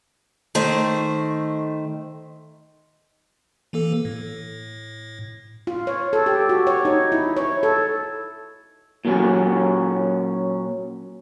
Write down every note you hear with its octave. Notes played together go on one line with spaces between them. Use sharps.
D#3 A3 C5
E3 A#3 A4
A2
F4
C#5
A4
G4
F#4
C#5
D#4
E4
C#5
A4
A#2 F#3 C#4